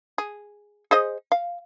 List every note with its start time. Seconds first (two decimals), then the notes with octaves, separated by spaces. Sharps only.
0.18 G#4
0.91 G#4 C5 D#5
1.32 F5